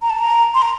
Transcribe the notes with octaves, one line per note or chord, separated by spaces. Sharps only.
A#5
A5
A#5
C6
A#5